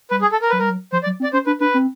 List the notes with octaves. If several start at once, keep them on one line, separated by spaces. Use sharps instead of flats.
G3 B4
G#4
A4
A#4
F#3 B4
G3 A#4
F#3
F3 C5
D5
F#3
C4
D5
C#4 C5
D4 B4
D4 B4
C4